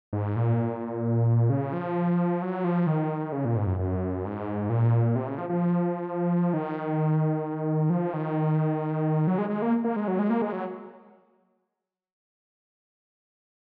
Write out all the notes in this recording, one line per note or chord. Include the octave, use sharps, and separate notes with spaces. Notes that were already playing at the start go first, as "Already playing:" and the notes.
G#2
A#2
C#3
F3
F#3
F3
D#3
C#3
A#2
G#2
F#2
F#2
G#2
A#2
C3
C#3
F3
F3
D#3
F3
D#3
F#3
G#3
G#3
A#3
A#3
G#3
F#3
G#3
A#3
G#3
F#3